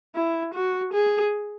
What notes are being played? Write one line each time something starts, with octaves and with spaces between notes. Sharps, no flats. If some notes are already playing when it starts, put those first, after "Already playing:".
E4
F#4
G#4